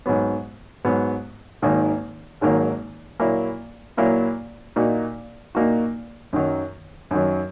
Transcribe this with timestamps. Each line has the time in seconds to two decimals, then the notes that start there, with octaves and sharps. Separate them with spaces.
0.06 G#2 F#3 B3
0.85 G#2 F#3 B3
1.62 G#1 G#2 D#3 F#3 A#3
2.41 G#1 G#2 D#3 F#3 A#3
3.20 A#2 F#3 A#3 E4
3.97 A#2 F#3 A#3 E4
4.76 A#2 A#3 D#4 F#4
5.55 A#2 A#3 D#4 F#4
6.33 F#2 D#3 F#3
7.11 F#2 D#3 F#3